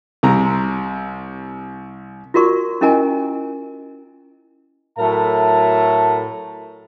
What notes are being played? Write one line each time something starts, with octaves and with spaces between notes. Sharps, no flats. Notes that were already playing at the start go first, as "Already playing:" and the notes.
C2 C3 A#5
F4 F#4 A#4 D5 C#6
C#4 E4 A#4 D#5 G#5 A#5
A2 F#3 A3 A#4 E5 A5